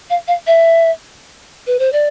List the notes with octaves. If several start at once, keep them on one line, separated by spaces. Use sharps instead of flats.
F5
F5
E5
B4
C5
D5